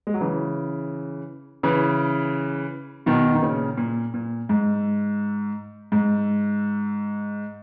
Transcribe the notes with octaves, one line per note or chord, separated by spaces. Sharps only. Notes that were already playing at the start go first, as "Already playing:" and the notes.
G#3
F#3
C#3 E3
C#3 E3
B2 D#3
D#3
A#2 C#3
A#2
A#2
G#2
G#2